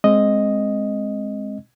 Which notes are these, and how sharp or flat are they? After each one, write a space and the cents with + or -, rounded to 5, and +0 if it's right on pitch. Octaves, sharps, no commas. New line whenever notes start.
G#3 +0 C4 +10 D#5 +0